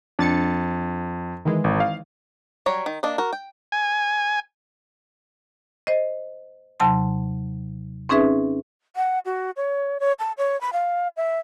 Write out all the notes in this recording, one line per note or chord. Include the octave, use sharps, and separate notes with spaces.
F2 D4 A6 C#7
D#3 E3 G#3
G#1
F5
F#3 G3 C#5 A#5
D#3
A#3 D4 D#5
F#4 A#4
G5
G#5
C5 D#5
D#2 C3 F#3 A5 C6
C4 C#4 D#4 G#4 B4 E5
F#5
F#4
C#5
C#5
A5
C#5
B5
F5
E5